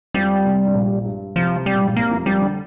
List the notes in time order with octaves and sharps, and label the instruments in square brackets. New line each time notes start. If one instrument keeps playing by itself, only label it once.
[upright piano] F2 F3 [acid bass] G3
[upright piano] C2 C3
G2
A#1 A#2
G2
[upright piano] C2 C3 [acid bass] F3
[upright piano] C3 [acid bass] G3
[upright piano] A#2
G2
A#1 A#2
[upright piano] C2 C3 [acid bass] A#3
[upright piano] F2 F3
[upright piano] F2 F3 [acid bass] G3
[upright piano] D3